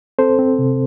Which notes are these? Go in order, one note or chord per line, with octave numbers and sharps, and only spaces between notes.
C4 A4 C5
C4
C3